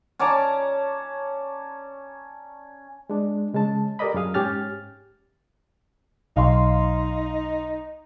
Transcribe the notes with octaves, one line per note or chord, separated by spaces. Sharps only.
C#4 D5 A5 A#5
G#3 D4
C#3 G#3 C#4 A5
G4 A4 A#4 D5 D#5 B5
F#2 C#4 G#4 F5 D#6
G#2 C#4 G4 G#5 F6 A6
B1 D#4 F5 C6